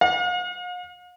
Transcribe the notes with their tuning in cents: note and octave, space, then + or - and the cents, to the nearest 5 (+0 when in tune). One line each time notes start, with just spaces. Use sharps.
F5 +45